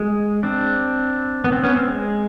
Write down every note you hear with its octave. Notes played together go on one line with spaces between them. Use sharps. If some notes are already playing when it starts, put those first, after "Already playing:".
Already playing: G#3
C4 D4
B3
C4
B3 C#4
C4
G#3